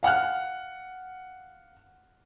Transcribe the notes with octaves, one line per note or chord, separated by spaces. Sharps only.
F5 F#5 F6 F#6